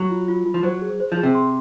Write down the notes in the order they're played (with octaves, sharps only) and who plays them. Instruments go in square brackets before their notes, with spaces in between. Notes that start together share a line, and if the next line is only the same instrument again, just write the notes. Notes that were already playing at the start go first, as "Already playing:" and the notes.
Already playing: [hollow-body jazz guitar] F#3
[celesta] F4
F4
F4
[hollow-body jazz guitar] F3
[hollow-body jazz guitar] F#3 [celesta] C5
[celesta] G#4
C5
[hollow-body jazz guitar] F3
[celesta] G#4
[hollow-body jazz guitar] C3
[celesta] C6